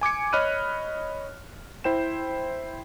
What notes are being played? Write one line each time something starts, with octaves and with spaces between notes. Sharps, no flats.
G#5 D6 G#6 C#7
C#5 D#5 B5 F6 F#6 D#7
E4 C5 G5 E7